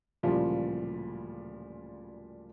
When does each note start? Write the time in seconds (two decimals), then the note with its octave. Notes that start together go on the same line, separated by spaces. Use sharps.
0.23 D1 A#2 C#3 F3 G3 F4